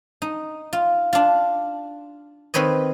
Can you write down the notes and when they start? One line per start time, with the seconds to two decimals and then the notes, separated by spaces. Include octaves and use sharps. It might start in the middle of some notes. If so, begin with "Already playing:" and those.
0.22 D#4
0.73 F4
1.13 D4 F4
2.54 D#3 C4 B4 C#5 D#5